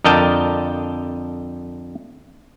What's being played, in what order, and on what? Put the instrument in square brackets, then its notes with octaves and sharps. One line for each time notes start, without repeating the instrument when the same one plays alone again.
[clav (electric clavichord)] F2 D3 A#4 D#5 G5 A5